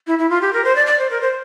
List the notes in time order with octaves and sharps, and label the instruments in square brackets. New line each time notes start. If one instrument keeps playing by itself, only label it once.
[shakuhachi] E4
E4
F4
G4
A#4
C5
D5
D5
C5
A#4
C5